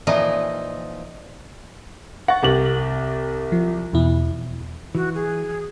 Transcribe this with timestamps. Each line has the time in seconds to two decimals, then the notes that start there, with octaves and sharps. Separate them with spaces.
0.07 A#2 E3 F3 D#4
2.28 F#5 C#6 A6 A#6
2.43 C2 G4 F#7
3.52 F3
3.93 E2 B2 E4
4.95 E3 F#4
5.15 G#4